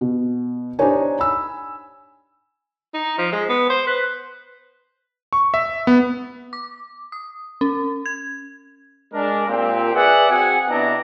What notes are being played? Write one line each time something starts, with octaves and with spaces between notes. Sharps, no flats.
B2
D4 D#4 G4 C5 C#5 G#5
G#5 B5 E6
D#4
F3
G#3
B3
C5
B4
C#6
E5
B3
D6
D#6
C#4
G#6
G#3 D4 A#4
A#2 C4 G4
G#4 B4 D5 E5 F#5
C4 F#4 G#4 F#5 G#5
C3 B3 D4 E4 D#5 A#5